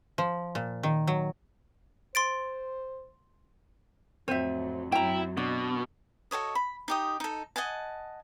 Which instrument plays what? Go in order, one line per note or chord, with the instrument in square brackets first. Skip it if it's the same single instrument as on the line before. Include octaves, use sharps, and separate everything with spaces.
[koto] F3
A#2
D#3
F#3
[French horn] C5 [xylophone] C6 A6 D7
[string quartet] F2 A2 F#3 [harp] C4 D#7 [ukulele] C5 E5
[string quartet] F#2 F#3 [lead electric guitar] E4 [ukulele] G5 A#5
[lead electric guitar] B2 [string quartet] B3 [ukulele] D4
[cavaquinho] F#4 A4 C#5 D#5
B5
D#4 G4 D#6
D#4 A4
D#5 F#5 G#5 A5